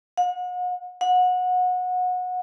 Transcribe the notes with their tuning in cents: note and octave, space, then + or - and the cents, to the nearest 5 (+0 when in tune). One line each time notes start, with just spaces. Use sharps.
F#5 -40
F#5 -25